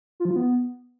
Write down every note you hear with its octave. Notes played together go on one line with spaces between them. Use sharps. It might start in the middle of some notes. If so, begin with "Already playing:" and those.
F4
F3
F4
B3